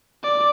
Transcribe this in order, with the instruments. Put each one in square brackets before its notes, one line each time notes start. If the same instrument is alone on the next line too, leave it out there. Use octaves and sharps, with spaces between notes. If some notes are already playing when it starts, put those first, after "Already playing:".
[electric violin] D5